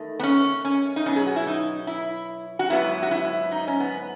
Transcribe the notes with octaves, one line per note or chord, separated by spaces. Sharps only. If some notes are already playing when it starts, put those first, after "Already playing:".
Already playing: E2 D#3 A3
B3
C#4
C#4
D#4
B2 F#3 B3 C#4
G#4
F#4
E4
D#4
E4
F#4
G#2 F#3 B3 E4
F#4
E4
D#4
C#4
B3